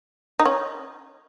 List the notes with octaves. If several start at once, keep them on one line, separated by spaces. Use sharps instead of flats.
D#4
C#4